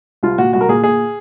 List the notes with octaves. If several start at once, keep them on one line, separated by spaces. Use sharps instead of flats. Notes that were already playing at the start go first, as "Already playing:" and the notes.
C2 F4
A#2 F#4
C2 F#4
A#4
A#2 G#4
A#2 G#4